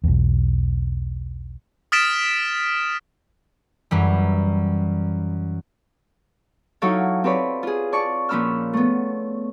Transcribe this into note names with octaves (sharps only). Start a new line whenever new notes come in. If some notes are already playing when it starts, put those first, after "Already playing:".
B1 E2
D#6 F6 A6 B6 D7 E7
F#2 E3 G3
F#3 D#4 E4 A4 C#5 F5
C4 G4 B4 C#5 D5 B5
F4 G#4
D5 A5 C#6
A#2 F3 C#4 B5 E6 F6
A3 B3